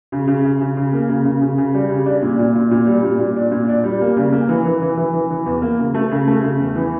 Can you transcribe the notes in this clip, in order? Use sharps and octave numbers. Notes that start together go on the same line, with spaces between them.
C#3
C#3
C#3
C#3
C#3
A#3
C#3
C#3
C#3
C#3
G3
C#3
D4
A#2
A#2
A#2
A#2
G3
A#2
A#2
D4
A#2
D4
G3
A#3
C#3
A#3
E3
E3
E3
E3
E3
E3
E2
A#3
C#3
A3
C#3
A3
C#3
E2
E3